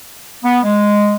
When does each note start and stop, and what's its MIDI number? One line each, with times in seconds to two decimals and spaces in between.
0.43 0.59 59
0.63 1.15 56